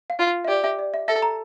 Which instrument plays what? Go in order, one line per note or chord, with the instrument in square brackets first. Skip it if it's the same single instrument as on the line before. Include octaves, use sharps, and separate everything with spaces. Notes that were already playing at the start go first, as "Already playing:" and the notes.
[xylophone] F5
[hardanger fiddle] F4
[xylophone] E5
[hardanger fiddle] G4 [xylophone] D5
[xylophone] E5
D5
E5
[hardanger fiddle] A4 [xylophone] E5
[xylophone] A#5